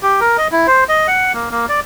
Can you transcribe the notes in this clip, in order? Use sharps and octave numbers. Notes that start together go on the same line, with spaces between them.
G4
A#4
D#5
E4
C5
D#5
F#5
A#3
A#3
D5